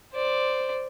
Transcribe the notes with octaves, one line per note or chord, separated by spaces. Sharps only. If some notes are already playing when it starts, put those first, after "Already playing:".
C5 D5